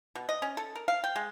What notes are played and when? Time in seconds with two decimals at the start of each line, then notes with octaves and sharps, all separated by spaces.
0.15 B2
0.29 D#5
0.42 C#4
0.57 A4
0.75 A#4
0.88 F5
1.04 G5
1.16 G#3